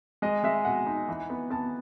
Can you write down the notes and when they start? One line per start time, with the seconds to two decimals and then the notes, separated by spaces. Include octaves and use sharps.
0.22 G#3 D#5
0.44 G#3 E5
0.65 B2 F#5
0.86 D#4
1.09 E3
1.30 B3
1.50 B3 A5